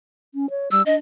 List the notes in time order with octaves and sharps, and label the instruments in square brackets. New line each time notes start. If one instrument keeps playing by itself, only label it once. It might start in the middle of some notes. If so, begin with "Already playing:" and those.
[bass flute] C#4
C#5
[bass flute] G3 [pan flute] E6
[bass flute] D4 [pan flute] D#5